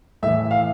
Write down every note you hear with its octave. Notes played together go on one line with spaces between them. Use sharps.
A2 E3 E5
F5